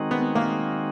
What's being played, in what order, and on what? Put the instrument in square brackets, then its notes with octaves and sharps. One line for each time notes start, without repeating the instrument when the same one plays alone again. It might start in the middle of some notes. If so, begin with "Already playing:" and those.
Already playing: [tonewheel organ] D#3 G#3 C4 D#4 F#4
[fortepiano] B3
A#3